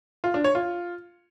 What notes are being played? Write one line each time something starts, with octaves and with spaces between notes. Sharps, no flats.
F4
D4
C#5
F4